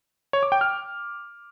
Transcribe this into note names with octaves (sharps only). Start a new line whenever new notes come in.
C#5
D6
G5
F6